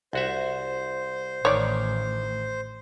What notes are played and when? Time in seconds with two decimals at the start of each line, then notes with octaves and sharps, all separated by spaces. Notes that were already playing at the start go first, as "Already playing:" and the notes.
0.13 C2 F#4 C5 E5
1.45 A1 D#3 C#5 D5